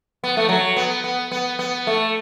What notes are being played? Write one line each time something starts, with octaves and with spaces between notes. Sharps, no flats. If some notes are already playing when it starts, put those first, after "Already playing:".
B3
A3
F#3
B3
B3
B3
B3
A3